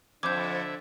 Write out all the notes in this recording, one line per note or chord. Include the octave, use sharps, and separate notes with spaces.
F2 D3 C5 E5 D6 G6 G#6